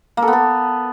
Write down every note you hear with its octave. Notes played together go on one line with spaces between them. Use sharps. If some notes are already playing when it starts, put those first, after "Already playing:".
A#3
A4
B3
A4